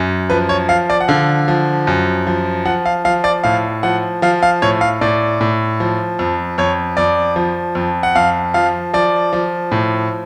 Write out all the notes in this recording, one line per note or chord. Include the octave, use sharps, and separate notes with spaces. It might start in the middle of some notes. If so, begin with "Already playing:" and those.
Already playing: F#2
F3 B4
C#5
F3 F5
D5
F#5
D3 F5
F3
F#2
F3
F3 F#5
F5
F3 F5
D5
A2 F5
F3 F#5
F3 F5
F5
A2 C#5
F5
A2 D5
A2
F3
F2
F2 C#5
F2 D5
F3
F2
F#5
F2 F5
F3 F5
F3 D5
F3
A2